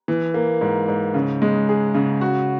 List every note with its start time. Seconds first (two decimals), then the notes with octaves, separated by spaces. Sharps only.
0.08 E3
0.34 A#3
0.61 G#2
0.88 G#2
1.14 C#3
1.42 G#3
1.69 G#4
1.94 C#3
2.21 F#4